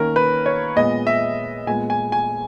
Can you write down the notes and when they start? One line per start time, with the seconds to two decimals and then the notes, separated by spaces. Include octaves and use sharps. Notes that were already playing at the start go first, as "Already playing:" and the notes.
Already playing: D#3 A#3 C#4 A#4
0.16 B4
0.46 C#5
0.76 A#2 G#3 B3 D#5
1.07 E5
1.67 A#2 G#3 B3 G#5
1.90 G#5
2.12 G#5